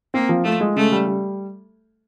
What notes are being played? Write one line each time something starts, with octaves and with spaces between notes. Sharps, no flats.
A#3 C4
F3
A3 F4
G#3
C#3 A3
G3
G3